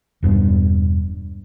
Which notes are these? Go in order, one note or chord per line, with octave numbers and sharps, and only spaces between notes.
E1 G2 B3